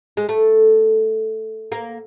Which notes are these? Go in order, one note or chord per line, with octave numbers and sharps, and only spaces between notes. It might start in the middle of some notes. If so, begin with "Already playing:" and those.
G#3
A3
A#3